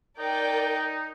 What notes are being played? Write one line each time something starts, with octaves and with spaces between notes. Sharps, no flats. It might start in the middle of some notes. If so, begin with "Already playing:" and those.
D#4 A#4 D5 G5